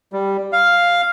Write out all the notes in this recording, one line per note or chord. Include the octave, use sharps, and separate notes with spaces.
G3
F5